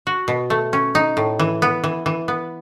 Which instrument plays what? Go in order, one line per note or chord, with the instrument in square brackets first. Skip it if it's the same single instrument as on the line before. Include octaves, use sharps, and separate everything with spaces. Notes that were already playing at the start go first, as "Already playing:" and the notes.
[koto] F#4
B2
A3
C#4
D#4
A2
E3
B3
E3
E3
B3